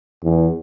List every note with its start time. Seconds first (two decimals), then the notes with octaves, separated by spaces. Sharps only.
0.23 E2